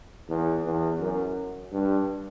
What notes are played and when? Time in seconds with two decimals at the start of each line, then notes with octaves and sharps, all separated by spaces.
0.29 E2
0.64 E2
1.00 F#2
1.72 G2